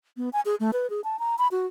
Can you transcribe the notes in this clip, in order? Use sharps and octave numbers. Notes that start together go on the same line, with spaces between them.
B3
G#5
G#4
A3
B4
G#4
A5
A#5
B5
F#4